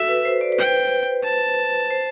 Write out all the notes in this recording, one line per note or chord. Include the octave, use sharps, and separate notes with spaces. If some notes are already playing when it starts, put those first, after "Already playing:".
Already playing: F#4 A4 E5
B4
C5
D5
B4
C5 G5
A5
C5